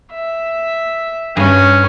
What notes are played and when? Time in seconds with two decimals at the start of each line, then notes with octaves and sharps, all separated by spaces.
0.12 E5
1.37 G2 C#4 G#5